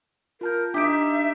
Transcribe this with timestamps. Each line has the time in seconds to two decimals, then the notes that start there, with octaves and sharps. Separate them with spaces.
0.41 F4 A#4 A5 G6
0.74 D4 D#4 G4 E5 D7